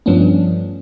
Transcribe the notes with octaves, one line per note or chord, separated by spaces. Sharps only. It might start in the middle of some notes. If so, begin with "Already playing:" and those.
G2 F3 A3 B3 C#4 D4